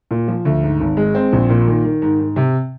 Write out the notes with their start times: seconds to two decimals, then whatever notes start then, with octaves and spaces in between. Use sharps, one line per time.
0.11 A#2
0.28 F3
0.45 D2
0.63 G#2
0.80 G#1
0.97 G#3
1.15 C4
1.33 A#1
1.49 A#2
1.67 D#3
1.84 D#3
2.02 G#2
2.19 G#2
2.36 C3